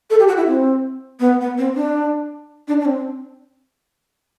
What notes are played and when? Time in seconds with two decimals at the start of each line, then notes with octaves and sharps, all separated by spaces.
0.10 A4
0.20 G4
0.28 F#4
0.37 E4
0.47 C4
1.20 B3
1.41 B3
1.58 C4
1.75 D4
2.68 D4
2.80 D4
2.85 C4